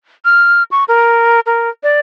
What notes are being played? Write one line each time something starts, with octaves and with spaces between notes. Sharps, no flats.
F6
C#6
A#4
A#4
D5